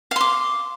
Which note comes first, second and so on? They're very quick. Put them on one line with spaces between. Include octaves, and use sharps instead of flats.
F5 C6 D6